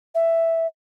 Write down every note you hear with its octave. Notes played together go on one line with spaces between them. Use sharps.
E5